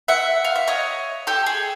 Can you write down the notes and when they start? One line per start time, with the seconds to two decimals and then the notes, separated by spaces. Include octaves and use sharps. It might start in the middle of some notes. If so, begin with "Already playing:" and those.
0.08 E5 F#5
0.45 F5
0.56 E5
0.68 C#5 D#5
1.27 G4 A4
1.46 G#4